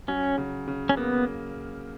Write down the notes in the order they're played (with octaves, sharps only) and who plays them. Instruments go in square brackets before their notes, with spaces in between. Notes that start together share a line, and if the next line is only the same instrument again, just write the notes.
[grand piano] F#3 [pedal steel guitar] C#4
[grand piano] C#3
C#3
[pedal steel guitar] C#4
[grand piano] A#3 [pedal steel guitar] B3